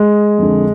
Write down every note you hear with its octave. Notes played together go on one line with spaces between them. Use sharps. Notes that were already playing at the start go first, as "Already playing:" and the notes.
Already playing: G#3
F2 D3